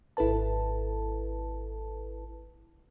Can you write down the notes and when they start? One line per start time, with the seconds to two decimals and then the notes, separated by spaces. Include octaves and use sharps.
0.17 G#1 E4 A4 B4 A5